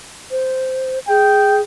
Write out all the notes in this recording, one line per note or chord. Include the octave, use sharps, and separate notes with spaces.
C5
G#4 G5